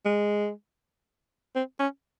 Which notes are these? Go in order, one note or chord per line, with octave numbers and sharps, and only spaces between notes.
G#3
C4
C#4